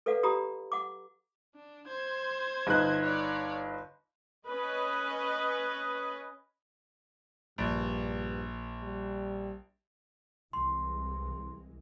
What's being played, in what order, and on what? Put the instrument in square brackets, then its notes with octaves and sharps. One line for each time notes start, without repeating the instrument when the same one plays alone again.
[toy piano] A4 B4 D5 F5 F#5
G4 D5 A#5 B5 D#6
F#5 D6
[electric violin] D4
C5 G#6
[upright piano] G1 D#4 F#6
[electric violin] C#5 D5
[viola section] C#4 B4 D#5
[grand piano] A#1 [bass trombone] G2
[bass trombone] G3
[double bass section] C2 E3 G#3 [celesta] C6